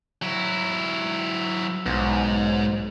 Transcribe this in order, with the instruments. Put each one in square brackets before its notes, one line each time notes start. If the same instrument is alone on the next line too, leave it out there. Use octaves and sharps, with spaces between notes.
[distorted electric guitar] F#3 E4
[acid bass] B1 [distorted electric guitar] G#2